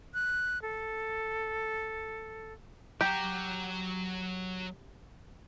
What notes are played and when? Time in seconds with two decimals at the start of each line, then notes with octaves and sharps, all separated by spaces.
0.14 F#6
0.62 A4
3.01 F#3 G4 A#5